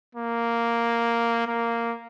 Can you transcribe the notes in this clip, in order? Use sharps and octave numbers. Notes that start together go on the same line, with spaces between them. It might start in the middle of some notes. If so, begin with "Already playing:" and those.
A#3
A#3